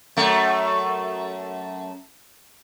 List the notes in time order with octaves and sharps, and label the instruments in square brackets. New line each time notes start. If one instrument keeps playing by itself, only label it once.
[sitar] F#2 A3